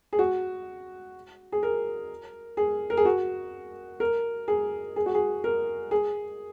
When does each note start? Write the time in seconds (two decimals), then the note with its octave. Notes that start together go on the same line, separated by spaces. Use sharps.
0.13 G#4
0.19 F#4
1.52 G#4
1.63 A#4
2.57 G#4
2.90 A#4
2.97 G#4
3.05 F#4
4.00 A#4
4.48 G#4
4.96 G#4
5.06 F#4
5.14 G#4
5.44 A#4
5.91 G#4